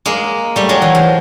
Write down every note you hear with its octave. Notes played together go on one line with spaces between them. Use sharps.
G#3 A#3
G3 A3
F#3 G#3
E3
F3